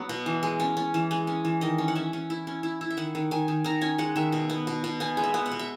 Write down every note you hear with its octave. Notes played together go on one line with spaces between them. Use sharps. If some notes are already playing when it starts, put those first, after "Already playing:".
Already playing: F#3 B3
B2
E3
G#3
C#4
C#4
E3
G#3
C#4
E3
D#3 D#5
C#4
F#5
C#4 E5
C#4
E4
C#4
E4
E4
E5
D#3 F#5
D#3
D#3 G#5
D#3
D#3 A#5
C#4 G#5
G#3 F#5
D#3 E5
B2
B3
B2
B2
B3 G#5
G#3
E5
B3
F#5
B2
E5